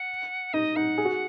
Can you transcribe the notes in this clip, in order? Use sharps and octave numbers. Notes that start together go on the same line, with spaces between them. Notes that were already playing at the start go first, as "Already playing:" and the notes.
Already playing: F#5
D#4 D#5
D#4 F#5
G#4
F#4